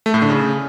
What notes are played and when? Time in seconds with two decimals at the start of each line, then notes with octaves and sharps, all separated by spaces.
0.06 A3
0.14 A2
0.22 D3
0.30 C#3